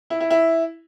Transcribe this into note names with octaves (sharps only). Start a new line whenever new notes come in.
E4
E4
E4